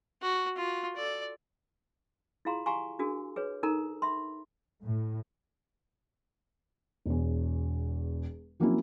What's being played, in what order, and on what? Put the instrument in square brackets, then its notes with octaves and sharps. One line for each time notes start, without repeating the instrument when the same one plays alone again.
[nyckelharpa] F#4
F4 F#4
A4 D5
[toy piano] E4 F4 G#4 F5 A#5 C6
G4 F5 G#5 A#5 C6 C#6
D4 F#4 G#4 A#4
G#4 B4 C#5
D#4 A4 A#4 A#5
E5 B5 C6
[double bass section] A2
[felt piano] E1 E2
F3 F#3 A#3 C4 C#4 E4